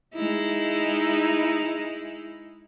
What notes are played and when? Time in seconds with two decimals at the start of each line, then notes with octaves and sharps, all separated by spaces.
0.15 G#3 D#4 E4